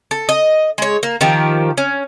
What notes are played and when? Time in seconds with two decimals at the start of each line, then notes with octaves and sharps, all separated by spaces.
0.11 A4
0.29 D#5
0.78 G#3 C#5
1.03 A#3
1.21 D#3 F3 G4
1.78 C#4